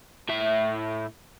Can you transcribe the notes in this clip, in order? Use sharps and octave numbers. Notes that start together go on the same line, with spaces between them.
A2 E5